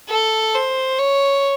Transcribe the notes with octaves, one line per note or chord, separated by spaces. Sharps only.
A4
C5
C#5